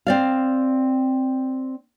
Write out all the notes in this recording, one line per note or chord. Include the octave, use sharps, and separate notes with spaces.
C4 D5 F5